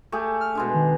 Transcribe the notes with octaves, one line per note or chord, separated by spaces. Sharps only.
A3 G4 G#4
F6
B2 G#3 D4
D#3